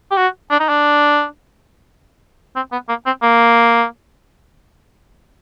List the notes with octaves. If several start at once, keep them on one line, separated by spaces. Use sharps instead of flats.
G4
F#4
D4
D#4
D4
C4
B3
A#3
C4
A#3